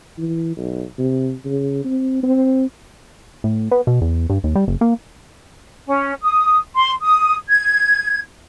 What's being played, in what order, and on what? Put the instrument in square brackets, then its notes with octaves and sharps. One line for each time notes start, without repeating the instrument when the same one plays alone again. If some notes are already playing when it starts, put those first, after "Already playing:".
[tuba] E3
B1
C3
C#3
C4
C4
[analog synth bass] A2
B3
B2
E2
G2
D#2
G3
F#1
A#3
[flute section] C#4
D#6
C6
D#6
G#6